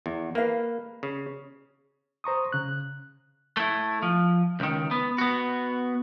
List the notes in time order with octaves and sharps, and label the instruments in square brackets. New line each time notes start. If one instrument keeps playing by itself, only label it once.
[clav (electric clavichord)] E2
[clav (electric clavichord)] A#3 [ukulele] B4 F5
[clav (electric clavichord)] C#3
[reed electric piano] C5 A#5 C#6 D#6
C#3 F#6
[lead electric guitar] A3 E4
F3
C#2 D#3
B3
B3 F#4